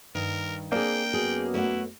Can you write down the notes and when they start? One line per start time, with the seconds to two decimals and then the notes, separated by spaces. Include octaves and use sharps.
0.15 G2 D#3 A#4
0.72 A#3 C4 D4 G#4 G5
1.14 F#2 B3 F#4 G#4
1.54 A3 E4 D5 F#5